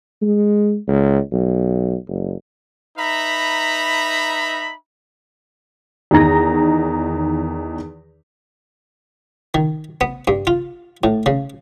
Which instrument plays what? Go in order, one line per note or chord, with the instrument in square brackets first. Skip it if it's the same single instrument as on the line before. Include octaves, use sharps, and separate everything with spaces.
[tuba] G#3
C#2
B1
F#1
[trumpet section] D#4 B4 E5 A#5 B5
[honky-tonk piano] E2 D#3 D#4 A#5 A#6
[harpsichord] D#3
B3
G2
F4
A2
C#3